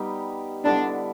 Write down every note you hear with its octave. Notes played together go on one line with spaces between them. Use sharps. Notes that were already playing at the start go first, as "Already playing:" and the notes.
Already playing: G3 B3 D#4 G4
D3 G3 B3 D4 E4